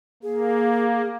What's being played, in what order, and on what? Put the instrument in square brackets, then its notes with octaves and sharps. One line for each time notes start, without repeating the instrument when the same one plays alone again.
[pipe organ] A#3 [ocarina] G#4